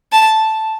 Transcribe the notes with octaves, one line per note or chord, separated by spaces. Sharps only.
A5